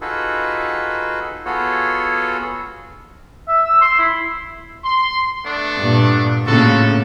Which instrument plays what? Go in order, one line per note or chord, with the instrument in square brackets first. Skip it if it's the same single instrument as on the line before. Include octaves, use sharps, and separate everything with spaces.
[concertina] D#4 F4 F#4 G#4 A4 B4
B3 F4 F#4 G#4 A4 C#5
[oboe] E5
E6
C6
E4
[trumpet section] C6
A3 B3 D4
[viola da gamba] G2 A#2
[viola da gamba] A2 C#3 A#3 [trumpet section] F4 F#4 A4